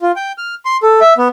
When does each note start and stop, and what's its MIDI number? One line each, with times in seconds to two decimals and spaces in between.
0.01 0.12 65
0.16 0.32 79
0.38 0.55 89
0.65 0.77 84
0.83 1.00 69
1.01 1.13 76
1.18 1.28 59